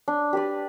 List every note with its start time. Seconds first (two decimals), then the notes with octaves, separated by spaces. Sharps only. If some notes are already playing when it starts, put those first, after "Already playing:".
0.08 D4
0.33 G4 B4 D5